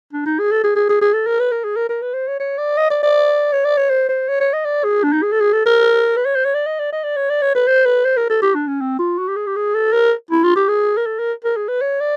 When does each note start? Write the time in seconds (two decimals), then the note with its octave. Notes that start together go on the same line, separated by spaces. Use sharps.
0.13 D4
0.26 D#4
0.39 G#4
0.52 A4
0.64 G#4
0.76 G#4
0.89 G#4
1.02 G#4
1.13 A4
1.27 A#4
1.40 B4
1.52 A#4
1.64 G#4
1.76 A#4
1.89 A#4
2.02 B4
2.14 C5
2.28 C#5
2.40 C#5
2.58 D5
2.78 D#5
2.91 D5
3.03 D5
3.53 C#5
3.65 D5
3.77 C#5
3.90 C5
4.09 C5
4.29 C#5
4.40 C#5
4.53 D#5
4.65 D5
4.84 G#4
5.03 D4
5.13 D#4
5.23 G#4
5.32 A4
5.41 G#4
5.53 A4
5.66 A#4
6.17 B4
6.26 C#5
6.35 C5
6.45 C#5
6.54 D5
6.67 D#5
6.80 D5
6.92 D#5
7.04 D5
7.17 C#5
7.30 D5
7.42 C#5
7.55 B4
7.68 C5
7.86 B4
8.05 C5
8.17 A#4
8.30 A4
8.42 G4
8.55 D4
8.67 C#4
8.81 C4
8.99 F4
9.19 F#4
9.28 G4
9.36 G#4
9.47 G4
9.56 G#4
9.75 A4
9.93 A#4
10.31 E4
10.43 F4
10.56 G4
10.68 G#4
10.97 A#4
11.06 A4
11.19 A#4
11.45 A#4
11.57 G#4
11.69 B4
11.81 C#5
12.01 D5